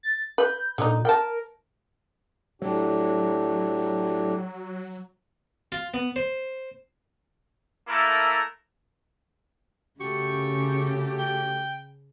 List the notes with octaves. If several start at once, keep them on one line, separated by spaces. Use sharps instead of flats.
A6
B4 G6
A#2 D3 D#4
A#4 G5 A5
A2 F#3 D4 G4
F4
B3
C5
A3 A#3 E4 A4 A#4
C#3 A3 F#4 G4 C#6
G5